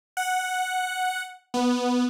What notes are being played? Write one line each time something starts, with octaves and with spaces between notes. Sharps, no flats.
F#5
B3